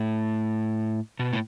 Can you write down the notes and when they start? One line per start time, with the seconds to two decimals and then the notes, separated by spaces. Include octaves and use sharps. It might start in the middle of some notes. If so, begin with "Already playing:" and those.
Already playing: A2
1.19 B2
1.33 A2